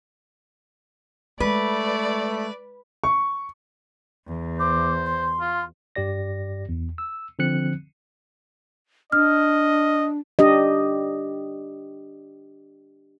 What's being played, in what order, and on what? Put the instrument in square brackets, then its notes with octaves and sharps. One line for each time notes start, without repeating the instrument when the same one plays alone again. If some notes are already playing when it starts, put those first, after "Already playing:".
[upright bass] G#3 [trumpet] A3 [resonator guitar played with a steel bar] B4 [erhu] D5
[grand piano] C#6
[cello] E2
[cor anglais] C5 [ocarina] D6
[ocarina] C6
[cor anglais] F4
[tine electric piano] G2 G4 D5 A#6
E2
E6
D3 F3 C4 F#6 C#7
[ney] D4 [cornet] D#5 [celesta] F6
[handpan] D4 G4 D#5